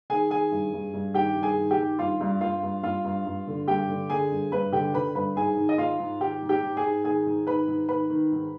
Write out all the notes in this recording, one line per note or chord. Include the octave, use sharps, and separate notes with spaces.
D#3 G#4 G#5
D#3 G#4 G#5
G2
G2
G2
D#3 G4 G5
G2
G#4 G#5
D#3
G4 G5
D#3
G2 F4 F5
G2
G2 F4 F5
G2
G2 F4 F5
G2
G2
D3
G2 G4 G5
D3
D3 G#4 G#5
G2
G2 B4 B5
D3 G4 G5
D3 B4 B5
G2 B4 B5
G#2 G#4 G#5
D#3
D#5
G#2 F4 F5
G#2
D#3 G4 G5
G#2
G4 G5
G#2
G#4 G#5
G#2
D#3 G#4 G#5
G#2
D#3 B4 B5
G#2
D#3 B4 B5
D#3
G#2